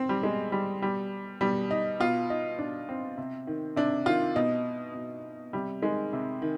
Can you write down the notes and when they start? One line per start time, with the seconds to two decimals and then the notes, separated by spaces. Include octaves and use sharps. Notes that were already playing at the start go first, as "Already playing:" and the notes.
Already playing: C4
0.09 G3
0.23 B2 G#3
0.52 G3
0.82 B2 G3
1.41 B2 G3
1.71 D#4
2.00 B2 F4
2.30 D#4
2.59 B2 D4
2.89 C4
3.18 C3
3.47 D#3
3.76 C3 D4
4.06 D#3 F4
4.36 B2 D#4
4.95 B2
5.53 C3 G3
5.82 D#3 G#3
6.13 C3
6.42 D#3